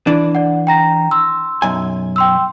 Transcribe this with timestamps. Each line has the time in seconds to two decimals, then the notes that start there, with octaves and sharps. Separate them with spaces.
0.07 E3 D4
0.35 D5 F#5
0.67 G5 A#5 A#6
1.11 C6 E6
1.62 B1 F#2 G#5
2.16 G5 C6 E6